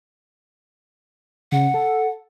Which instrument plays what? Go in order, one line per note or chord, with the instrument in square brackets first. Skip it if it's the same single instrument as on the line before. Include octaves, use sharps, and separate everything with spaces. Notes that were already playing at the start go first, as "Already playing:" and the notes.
[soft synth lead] C#3 [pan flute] F#5
[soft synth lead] A4